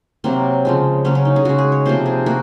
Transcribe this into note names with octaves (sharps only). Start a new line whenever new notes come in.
C3 F#3 A#3 C4
C#3 F3 G#3
C#3 F#3 A#3 C#4
C#4
D#4
G#4
C#3 G#3 F#4
G#4
C#5
C3 F3 A#3 C5
G#4
A#3 F#4